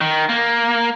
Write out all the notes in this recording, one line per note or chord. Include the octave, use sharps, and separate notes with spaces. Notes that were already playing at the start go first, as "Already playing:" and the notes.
D#3
A#3